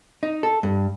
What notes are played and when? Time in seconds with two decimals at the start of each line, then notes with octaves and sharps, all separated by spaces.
0.23 D#4
0.43 A4
0.63 G2